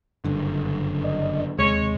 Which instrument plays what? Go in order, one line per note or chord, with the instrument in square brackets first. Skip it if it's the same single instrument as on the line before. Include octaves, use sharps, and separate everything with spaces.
[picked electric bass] F#1 G2 D3
[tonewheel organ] D5 D#5
[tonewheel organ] D#2 C3 [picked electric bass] G#3 [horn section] C#5